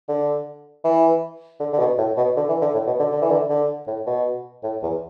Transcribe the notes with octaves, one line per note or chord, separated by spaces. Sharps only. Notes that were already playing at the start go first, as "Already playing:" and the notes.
D3
E3
D3
D3
B2
A2
B2
D3
E3
D3
A2
B2
D3
D3
E3
D3
D3
A2
B2
A2
E2